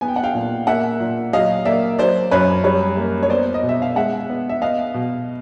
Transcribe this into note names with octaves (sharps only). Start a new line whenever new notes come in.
B3 G#5
G5
F#5
F5 G5
A#2
A#3 E5 F#5
A#2
F#3 D#5 F5
A#3 D5 E5
F#3 C5 D5
F#2 B4 C#5
G3 B4 C#5
A#3
C#5
B3 C5 D5
D#5
B2
E5
F5
G#3 E5 F#5
B3
E5
B3 D#5 F5
B2